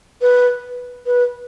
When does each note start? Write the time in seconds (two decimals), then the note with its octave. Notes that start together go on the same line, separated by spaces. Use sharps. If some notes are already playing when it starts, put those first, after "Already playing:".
0.21 B4
1.06 B4